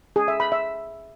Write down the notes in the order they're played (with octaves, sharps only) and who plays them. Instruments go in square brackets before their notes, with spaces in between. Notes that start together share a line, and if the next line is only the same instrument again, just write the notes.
[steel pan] G#4
E5
B5
E5